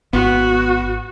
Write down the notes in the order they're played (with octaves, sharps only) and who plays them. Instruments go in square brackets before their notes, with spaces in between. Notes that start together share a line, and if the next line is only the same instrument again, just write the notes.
[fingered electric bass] G#1 [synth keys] B3 [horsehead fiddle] F#4